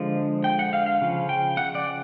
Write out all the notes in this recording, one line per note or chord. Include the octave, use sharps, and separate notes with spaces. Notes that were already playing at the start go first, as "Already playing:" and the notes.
Already playing: D3 F3 G#3
G5
F#5
F5
F5
C#3 F3
G5
F#5
D5